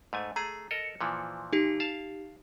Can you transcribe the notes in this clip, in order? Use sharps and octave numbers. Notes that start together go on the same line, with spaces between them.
G#2 A3 G#5
A3 G#4 A#5
A4 A#4 D#5 C#7
A#2 E3 F3
D#4 G4
F5 A5